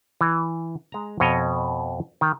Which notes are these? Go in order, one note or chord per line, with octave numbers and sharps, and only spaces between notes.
E3
G#3 A#5
F2 B2 C#5 D#5
D#3